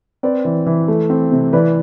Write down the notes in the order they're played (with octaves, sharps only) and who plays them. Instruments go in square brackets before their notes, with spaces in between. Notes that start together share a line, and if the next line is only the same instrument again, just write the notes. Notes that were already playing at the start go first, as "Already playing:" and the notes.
[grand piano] C4 B4 D5
E3
E3
A3
C4
C3
E3 B4 D5